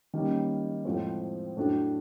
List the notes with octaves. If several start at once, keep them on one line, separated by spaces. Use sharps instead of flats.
D#3 G3 A#3 C#4
A2 F3 G#3 C4
A2 F#3 A3 D4 F#4